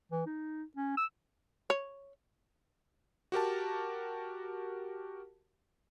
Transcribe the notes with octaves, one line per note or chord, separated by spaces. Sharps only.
E3
D#4
C#4
E6
C#5
F#4 G4 A#4 A5